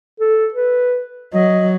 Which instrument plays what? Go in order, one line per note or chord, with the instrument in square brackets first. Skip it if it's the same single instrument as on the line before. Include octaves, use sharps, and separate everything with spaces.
[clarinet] A4
B4
[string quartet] F#3 [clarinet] D#5